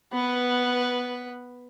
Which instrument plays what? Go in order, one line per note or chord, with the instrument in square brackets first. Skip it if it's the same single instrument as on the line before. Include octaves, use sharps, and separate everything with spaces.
[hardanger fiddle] B3 B4